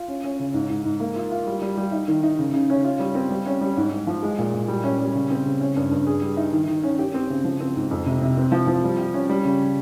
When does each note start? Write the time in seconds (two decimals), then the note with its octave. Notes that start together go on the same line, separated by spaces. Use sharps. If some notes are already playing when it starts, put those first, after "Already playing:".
Already playing: F4
0.08 C#4
0.24 C#4
0.40 C#3
0.54 G#2
0.70 G#2
0.85 G#2
1.00 A#3
1.16 F4
1.31 F4
1.47 G3
1.62 G3
1.77 G3
1.92 D#4
2.08 D#3
2.23 D#4
2.39 C#3
2.54 C#3
2.70 C#4
2.84 F4
3.00 G3
3.15 C4
3.31 G3
3.46 C#4
3.61 G3
3.77 G#2
3.92 G#2
4.07 F3
4.23 G#3
4.38 A#2
4.54 A#2
4.68 G3
4.84 C#4
5.00 G3
5.15 C#3
5.30 C4
5.46 C#3
5.61 C#4
5.76 G2
5.91 G2
6.06 G#4
6.22 G3
6.37 D#4
6.53 D#3
6.68 D#3
6.83 C#4
6.99 G4
7.14 C4
7.30 C#3
7.44 F3
7.60 C4
7.76 G#2
7.91 F2
8.06 C3
8.22 C3
8.37 C4
8.52 F3
8.67 F3
8.84 G3
8.98 G4
9.14 C#4
9.30 G3
9.45 C#3